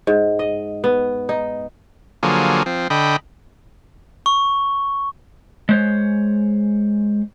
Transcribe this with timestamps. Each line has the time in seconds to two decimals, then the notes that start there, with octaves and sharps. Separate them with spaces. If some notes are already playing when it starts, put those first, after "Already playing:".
0.07 G#2
0.39 D#5
0.84 B3
1.29 D#4
2.23 D3 F3 F#3 A#3 G#4
2.66 F3 C4
2.90 D3 D#5 G5 B5
4.26 C#6
5.69 G#3 C5 C#5